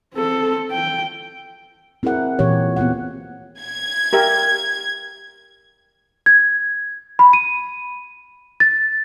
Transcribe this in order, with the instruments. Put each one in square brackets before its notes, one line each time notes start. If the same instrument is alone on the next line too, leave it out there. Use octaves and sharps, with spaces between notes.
[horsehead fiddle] C4 A4
G5
[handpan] C4 E4 G#4 A#4 F#5
A#2 E3 G4 C#5
B3 C4 F4 F#5
[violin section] G#6
[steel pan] G4 A#4 E5
[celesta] G#6
B5
D#7
A6